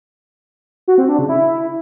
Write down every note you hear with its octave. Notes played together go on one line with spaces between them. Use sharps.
F#4
C4
D4
C#3
E4